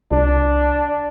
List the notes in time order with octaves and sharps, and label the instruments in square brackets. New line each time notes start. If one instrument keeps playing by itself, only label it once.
[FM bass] C2 [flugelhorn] D4